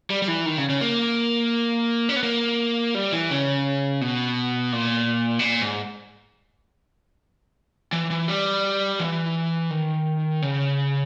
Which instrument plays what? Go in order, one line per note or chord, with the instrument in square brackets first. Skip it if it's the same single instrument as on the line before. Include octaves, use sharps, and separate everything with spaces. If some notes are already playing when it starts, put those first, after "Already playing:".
[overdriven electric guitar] G3
G3
E3
D#3
C#3
C#3
A#3
C#4
B3
A#3
G3
E3
C#3
B2
A#2
B2
A#2
G#2
E3
E3
G3
E3
D#3
C#3